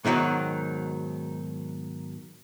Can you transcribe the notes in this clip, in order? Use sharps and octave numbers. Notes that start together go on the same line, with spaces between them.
G#2 B2 D#3 E3 F#3